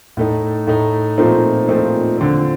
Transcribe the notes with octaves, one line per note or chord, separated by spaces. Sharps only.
A2 A3 D#4
A2 A3 D#4
A#2 F3 A3 C4 D#4
A#2 F3 A3 C4 D#4
D3 F3 C4